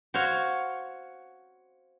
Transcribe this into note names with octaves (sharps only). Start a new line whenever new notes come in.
F#4 C5 C#5 F5